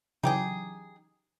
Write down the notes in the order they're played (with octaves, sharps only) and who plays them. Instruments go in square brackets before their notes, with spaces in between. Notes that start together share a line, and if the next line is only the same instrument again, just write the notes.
[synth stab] C#3 E3 F#3 [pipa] D#4 G4 G#4